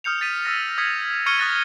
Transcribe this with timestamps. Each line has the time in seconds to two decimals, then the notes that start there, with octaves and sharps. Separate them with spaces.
0.04 D#6 F6 G6 C#7 F7
0.20 D#6 A6 B6 D#7
0.45 E6 F6 A#6
0.78 D#6 G#6 B6 C#7
1.26 C#6 F6 G#6 C#7 D#7 G7
1.38 D#6 E6 F#6 A6 A#6 D#7